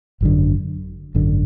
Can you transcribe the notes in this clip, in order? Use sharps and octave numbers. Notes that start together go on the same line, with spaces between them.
G#1 F#2 D3
G#1 F#2 D3